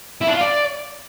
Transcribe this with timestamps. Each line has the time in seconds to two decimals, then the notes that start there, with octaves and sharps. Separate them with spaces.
0.21 E4
0.28 D4
0.34 F4
0.40 D5